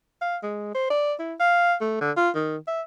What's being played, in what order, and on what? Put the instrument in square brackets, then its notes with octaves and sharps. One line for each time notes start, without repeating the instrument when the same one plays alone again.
[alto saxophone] F5
G#3
C5
D5
E4
F5
A3
D3
F4
D#3
E5